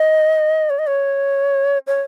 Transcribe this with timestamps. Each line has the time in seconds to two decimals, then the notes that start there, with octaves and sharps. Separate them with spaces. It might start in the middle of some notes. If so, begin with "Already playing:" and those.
Already playing: D#5
0.70 C#5
0.79 D#5
0.87 C#5
1.87 C#5